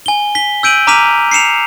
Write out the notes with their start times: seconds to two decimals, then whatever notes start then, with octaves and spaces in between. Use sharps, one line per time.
0.06 G#5 G7
0.35 B6 G7
0.63 E6 G6 D7 D#7 F#7
0.87 A#5 D6 F6 B6 D#7 F7
1.31 C7 C#7 E7 F7